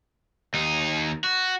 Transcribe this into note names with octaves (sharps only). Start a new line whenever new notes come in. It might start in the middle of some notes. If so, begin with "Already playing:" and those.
D#2 D#4
F#4